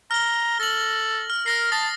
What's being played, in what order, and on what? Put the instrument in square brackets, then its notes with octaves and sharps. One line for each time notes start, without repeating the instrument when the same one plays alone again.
[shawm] A#5 [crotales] F6 G7
[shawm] A4 [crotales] A#6 F#7
[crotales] F6
[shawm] A#4 [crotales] F6 A#6 C7
[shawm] A5 [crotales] D#6 A6 A#6